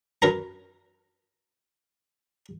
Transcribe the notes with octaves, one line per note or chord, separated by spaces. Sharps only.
F#2 A#4 B4 A#5